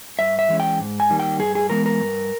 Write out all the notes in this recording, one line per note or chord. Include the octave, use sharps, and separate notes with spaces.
G2 E5
E5
E3 G#3 C#4
G5
G#2
G#5
D#3 G3 A#3
G5
G2 G#4
G#4
E3 G#3 B3 A#4
A#4
G2